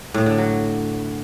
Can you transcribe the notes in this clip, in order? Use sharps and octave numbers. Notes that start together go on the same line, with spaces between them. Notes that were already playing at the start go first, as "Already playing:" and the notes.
A2
D3
F#3